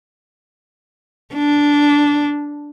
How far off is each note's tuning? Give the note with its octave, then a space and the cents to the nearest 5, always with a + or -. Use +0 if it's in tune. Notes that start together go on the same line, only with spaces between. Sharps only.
D4 -10